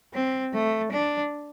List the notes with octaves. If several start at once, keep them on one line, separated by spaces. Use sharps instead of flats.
C4
A3
D4